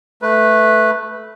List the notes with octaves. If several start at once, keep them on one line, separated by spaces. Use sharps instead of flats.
A3 B4